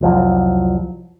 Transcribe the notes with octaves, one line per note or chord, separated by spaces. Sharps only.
F1 C2 F3 F#3